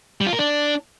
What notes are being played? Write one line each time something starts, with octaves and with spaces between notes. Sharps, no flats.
G3
F4
A#4
D4